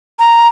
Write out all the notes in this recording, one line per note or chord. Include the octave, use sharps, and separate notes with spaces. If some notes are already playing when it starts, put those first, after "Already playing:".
A#5